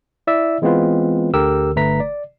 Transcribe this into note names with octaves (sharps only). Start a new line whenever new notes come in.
E4 D5 E5 E6
E3 G#3 B3 C4 F4 B4
D2 D3 G4 A#4 E6
G1 D3 A3 B4 A#5 B6
D5